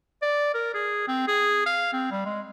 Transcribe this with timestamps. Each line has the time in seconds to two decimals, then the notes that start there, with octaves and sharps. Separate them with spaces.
0.22 D5
0.54 A#4
0.74 G#4
1.08 C4
1.28 G#4
1.66 F5
1.93 C4
2.11 G3
2.25 G#3